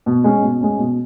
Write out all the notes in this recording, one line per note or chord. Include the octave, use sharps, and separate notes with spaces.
B2
G#3 C#4
B2
G#3 C#4
B2